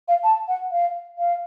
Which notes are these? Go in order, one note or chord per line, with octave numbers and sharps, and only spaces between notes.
F5
A5
F#5
F5
F5